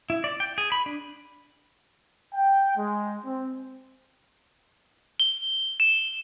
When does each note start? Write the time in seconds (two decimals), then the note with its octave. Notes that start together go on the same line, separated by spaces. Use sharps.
0.10 E4
0.24 D5
0.40 G5
0.58 G#4
0.72 B5
0.86 D4
2.34 G5
2.77 G#3
3.25 C4
5.20 G7
5.80 E7